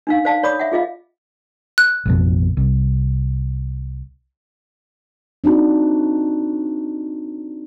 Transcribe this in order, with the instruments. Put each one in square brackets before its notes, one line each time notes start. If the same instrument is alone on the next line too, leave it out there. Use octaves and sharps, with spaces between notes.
[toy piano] D4 D#4 F5
C5 D5 F5 A5
C#5 D5 B5 D6 D#6
E5 F#5
F4 G#4 D#5 F5
[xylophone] F#6
[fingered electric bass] A1 F2 B2
C2
[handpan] C4 D4 D#4 F#4